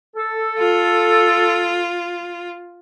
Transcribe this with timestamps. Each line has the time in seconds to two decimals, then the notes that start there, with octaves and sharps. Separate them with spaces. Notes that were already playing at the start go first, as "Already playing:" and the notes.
0.16 A4
0.59 F4